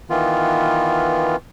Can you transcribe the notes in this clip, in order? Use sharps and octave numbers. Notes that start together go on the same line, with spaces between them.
D#3 E3 B3 F4